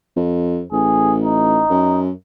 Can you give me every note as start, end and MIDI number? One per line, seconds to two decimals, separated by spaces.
0.16 0.63 41
0.73 1.63 33
0.73 1.15 68
1.23 2.01 63
1.70 2.11 42